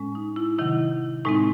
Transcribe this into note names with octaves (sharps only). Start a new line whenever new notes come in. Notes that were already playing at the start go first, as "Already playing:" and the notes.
Already playing: A2 G#3 C#4
D#4
E4
C3 D#3 F#3 E4
A2 G#3 C4 D#4